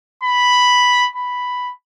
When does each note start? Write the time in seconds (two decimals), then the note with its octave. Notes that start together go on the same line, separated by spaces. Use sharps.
0.23 B5
1.16 B5